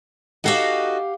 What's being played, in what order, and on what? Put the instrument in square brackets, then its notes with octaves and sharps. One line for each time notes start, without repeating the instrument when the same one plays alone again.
[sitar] D#4 F#4 A4 [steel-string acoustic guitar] G4 F5 F#5